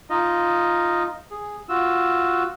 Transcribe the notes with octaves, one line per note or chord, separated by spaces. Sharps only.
D#4 F4 D#5
G#4
F4 F#4 E6